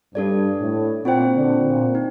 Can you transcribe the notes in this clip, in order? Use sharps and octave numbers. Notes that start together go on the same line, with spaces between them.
G2 D4 A4 D5
A2
A#2 C4 F4 C5 G5
A#2 D3
A#2
D#4